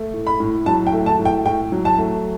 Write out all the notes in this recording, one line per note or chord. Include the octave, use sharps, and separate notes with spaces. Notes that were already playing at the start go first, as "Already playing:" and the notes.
Already playing: A3
A2
B5
A2
F#3 A5
G5
A3
A5
A2
G5
A2 G5
F#3
A5
A3